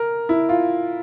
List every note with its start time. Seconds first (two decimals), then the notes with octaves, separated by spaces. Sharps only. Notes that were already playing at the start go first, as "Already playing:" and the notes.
Already playing: A#4
0.29 E4
0.49 F4